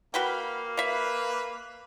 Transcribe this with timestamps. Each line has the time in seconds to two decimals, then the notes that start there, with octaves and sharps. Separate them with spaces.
0.14 A#3 F#4 B4 F5 G5 B5
0.77 B4 E5 F5